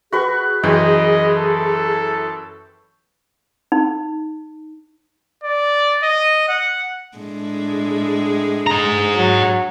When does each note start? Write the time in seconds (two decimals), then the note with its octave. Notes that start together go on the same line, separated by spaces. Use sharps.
0.12 F#4 G#4 B4 C#6
0.63 F#2 E3 D#5 G5
1.37 A4
3.72 D#4
5.44 D5
6.03 D#5
6.49 F#5
7.17 A2 G#3 D4
8.67 G#4 A#5
9.16 F#3